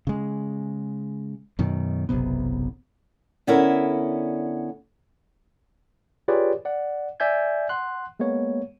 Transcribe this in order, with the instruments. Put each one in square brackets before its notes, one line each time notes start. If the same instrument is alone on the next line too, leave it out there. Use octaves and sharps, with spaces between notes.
[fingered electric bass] C#3 G#3
F#2 B2 D#3
F#1 B1 C3 B3
[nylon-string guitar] D3 B3 C#4 E4 A4 A#4
[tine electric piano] F4 G4 G#4 B4 C#5 D5
D5 F#5
D5 E5 G#5 G6 G#6
F#5 C6 F#6
G#3 A#3 B3 C#5